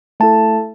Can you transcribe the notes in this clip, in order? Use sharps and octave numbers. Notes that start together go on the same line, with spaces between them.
A3 E4 A4 A5